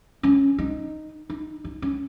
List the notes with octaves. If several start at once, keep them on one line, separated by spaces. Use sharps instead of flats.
C#4
D#4
D#4
D#4
C#4